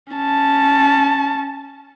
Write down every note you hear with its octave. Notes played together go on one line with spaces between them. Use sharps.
C#4 A5